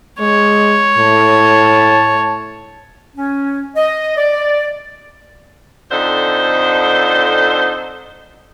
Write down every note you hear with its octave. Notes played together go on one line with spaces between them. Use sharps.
G#3 C#5
A2 A5
C#4
D#5
D5
F2 D3 D#4 A4 C5